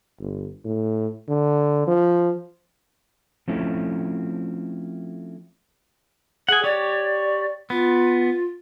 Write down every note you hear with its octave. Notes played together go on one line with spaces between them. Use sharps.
G1
A2
D3
F3
F3 A3 C4 C#4 E4
G#4 F#5 G#5
G4 C#5 D5
B3 F4